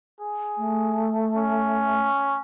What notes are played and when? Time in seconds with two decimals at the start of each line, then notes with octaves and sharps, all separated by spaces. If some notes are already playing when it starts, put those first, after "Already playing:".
0.20 G#4
0.58 A3
1.37 C#4